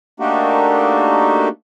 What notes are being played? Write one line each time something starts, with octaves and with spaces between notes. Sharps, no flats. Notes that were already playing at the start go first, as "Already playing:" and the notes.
A3 A#3 D4 D#4 F#4 G4